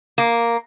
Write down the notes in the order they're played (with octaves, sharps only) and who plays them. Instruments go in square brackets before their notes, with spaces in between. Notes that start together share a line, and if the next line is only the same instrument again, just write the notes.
[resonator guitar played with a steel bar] A#3